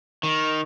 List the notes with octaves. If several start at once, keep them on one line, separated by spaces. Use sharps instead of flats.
D#3